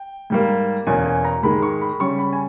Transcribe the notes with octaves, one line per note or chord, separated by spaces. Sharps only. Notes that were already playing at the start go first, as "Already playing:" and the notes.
Already playing: G5
G#2 G3 A#3
E2 B2 A#3 C#4 G#5
G#5
A#5
G#2 D#3 G#3 B5
C#6
B5
C#3 G3 C#4 C#6
B5
G#5